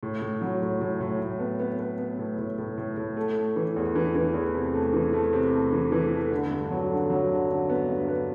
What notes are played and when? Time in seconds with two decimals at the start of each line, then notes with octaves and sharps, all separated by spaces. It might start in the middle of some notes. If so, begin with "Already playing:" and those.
0.03 A2
0.22 A2
0.41 F#3
0.62 A2
0.81 A2
1.00 A2
1.20 A2
1.39 B3
1.59 B3
1.79 B3
1.98 B3
2.19 A2
2.38 A2
2.58 A2
2.78 A2
2.97 A2
3.17 A3
3.36 A3
3.56 E3
3.76 E2
3.95 E3
4.15 E3
4.34 E2
4.54 C3
4.74 A3
4.93 E3
5.13 A3
5.33 C3
5.53 A3
5.72 E3
5.92 E3
6.12 A3
6.31 D3
6.51 G2
6.71 F#3
6.90 D3
7.10 F#3
7.30 D3
7.49 D3
7.69 B3
7.89 G2
8.08 B3